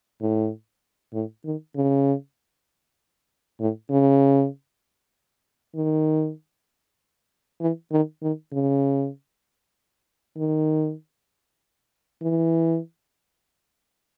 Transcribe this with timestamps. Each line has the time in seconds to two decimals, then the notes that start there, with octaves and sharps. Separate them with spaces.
0.21 A2
1.14 A2
1.45 D#3
1.76 C#3
3.60 A2
3.91 C#3
5.75 D#3
7.61 E3
7.91 D#3
8.22 D#3
8.53 C#3
10.38 D#3
12.22 E3